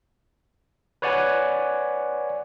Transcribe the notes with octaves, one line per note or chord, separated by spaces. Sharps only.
B4 C#5 D5 F#5 G#5